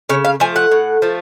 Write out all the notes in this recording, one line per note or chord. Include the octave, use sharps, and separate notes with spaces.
C#3 C#5
F5
F3 A3 G#5
F#5
A2
F3 A3